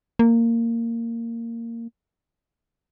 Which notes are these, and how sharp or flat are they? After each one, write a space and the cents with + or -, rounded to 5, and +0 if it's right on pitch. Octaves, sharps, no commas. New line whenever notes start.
A#3 -15